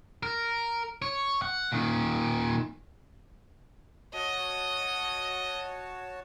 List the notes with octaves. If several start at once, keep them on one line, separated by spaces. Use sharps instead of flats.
A#4
C#5
F#5
A#2 D#3
F#4 C#5 D#5 A5